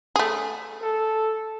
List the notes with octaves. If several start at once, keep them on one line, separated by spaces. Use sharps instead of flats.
A3 G#4
A4